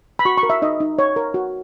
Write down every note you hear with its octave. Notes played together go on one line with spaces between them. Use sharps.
B5
F#4 C#6
C#6
A#4
E5
D#4 D#5
D#4
C#5
A#4
F#4